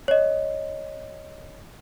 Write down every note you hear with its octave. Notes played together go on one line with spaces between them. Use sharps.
C#5 D#5